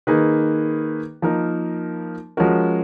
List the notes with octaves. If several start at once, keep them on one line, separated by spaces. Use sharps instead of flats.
D#3 A#3 D#4 G#4 B4
F3 A#3 D#4 A#4
F3 G#3 C#4 F#4 A#4